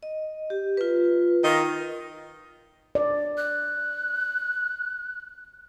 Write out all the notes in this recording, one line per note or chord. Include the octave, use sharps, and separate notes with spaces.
D#5
G4
F4 B4
D#3 F4 D#5
D5
F#6